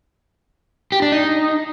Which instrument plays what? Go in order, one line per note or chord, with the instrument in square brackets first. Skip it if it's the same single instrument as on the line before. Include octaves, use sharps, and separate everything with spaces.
[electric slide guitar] G4
D4
D#4